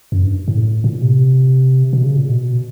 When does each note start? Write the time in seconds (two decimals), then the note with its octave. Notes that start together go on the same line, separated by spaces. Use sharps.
0.12 F#2
0.24 G2
0.48 A2
0.84 A#2
1.02 C3
1.93 B2
2.05 C#3
2.17 A#2
2.29 B2